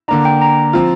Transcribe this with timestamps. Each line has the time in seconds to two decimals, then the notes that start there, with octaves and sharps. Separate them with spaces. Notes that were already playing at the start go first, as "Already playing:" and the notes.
0.08 D3 A#3 D4 A#5
0.25 G5
0.41 A#5
0.73 F3 C4 F4